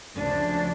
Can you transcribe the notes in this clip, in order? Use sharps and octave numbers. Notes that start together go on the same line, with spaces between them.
D2 C#3 F3 D4